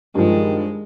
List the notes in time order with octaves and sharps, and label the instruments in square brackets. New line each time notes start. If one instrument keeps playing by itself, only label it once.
[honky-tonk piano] G2 F3 [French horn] D#3 [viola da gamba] G#3